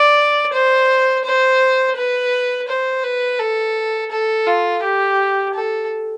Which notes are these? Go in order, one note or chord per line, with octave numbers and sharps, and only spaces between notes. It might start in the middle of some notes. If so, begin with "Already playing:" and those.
Already playing: D5
C5
C5
B4
C5
B4
A4
A4
F4
G4
A4